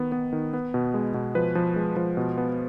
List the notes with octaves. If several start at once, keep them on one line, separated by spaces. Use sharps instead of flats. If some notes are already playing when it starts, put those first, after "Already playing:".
Already playing: D#3 B3
B3
D#3
B3
B2
G#3
B2
F3 B4
F3
G#3
F3
B2
B3